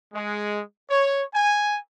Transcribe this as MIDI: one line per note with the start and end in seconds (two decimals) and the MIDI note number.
0.14 0.61 56
0.90 1.24 73
1.34 1.79 80